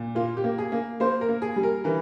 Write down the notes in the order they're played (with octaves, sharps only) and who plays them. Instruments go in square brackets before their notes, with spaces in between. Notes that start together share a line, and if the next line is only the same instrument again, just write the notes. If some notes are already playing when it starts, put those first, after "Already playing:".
Already playing: [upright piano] A#2
A#3 F4
G4
A#3
G#4
A#3
A#3 C5
A#4
A#3
G#4
G3
A#4
E3 A#4